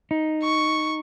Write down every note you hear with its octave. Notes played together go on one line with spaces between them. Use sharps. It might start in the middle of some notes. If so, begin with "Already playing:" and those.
D#4
C#6